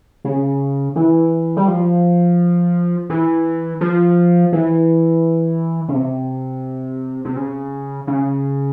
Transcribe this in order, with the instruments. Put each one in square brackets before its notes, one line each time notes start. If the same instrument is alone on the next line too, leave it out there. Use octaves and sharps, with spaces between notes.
[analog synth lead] C#3
E3
G3
F3
E3
F3
E3
C#3
C3
C3
C#3
C#3